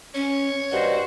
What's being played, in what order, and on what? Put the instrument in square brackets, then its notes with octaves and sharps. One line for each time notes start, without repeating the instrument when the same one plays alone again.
[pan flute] C#4 [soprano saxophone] C#5
[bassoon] G2 [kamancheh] F#4 C5 [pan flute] D#5